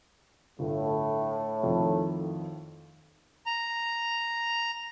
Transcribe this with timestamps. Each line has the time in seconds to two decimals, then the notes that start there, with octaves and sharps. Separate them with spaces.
0.59 G1 A2
1.64 F2 D#3
3.46 A#5